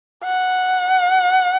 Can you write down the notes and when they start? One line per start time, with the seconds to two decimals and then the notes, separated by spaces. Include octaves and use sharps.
0.24 F#5